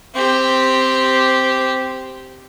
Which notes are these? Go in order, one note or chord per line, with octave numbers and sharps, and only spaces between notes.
C4 G4